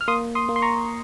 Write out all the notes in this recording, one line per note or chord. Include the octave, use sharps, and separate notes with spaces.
F6
A#3 C6 D#6
C6 D#6
A#3
C6
A#5 C#6